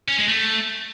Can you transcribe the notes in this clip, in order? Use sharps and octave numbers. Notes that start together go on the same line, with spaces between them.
C#4
G#3
A3